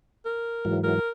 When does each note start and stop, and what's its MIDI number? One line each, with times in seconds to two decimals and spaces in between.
0.25 0.77 70
0.65 1.00 44
0.65 1.00 52
0.65 1.00 54
0.83 1.10 70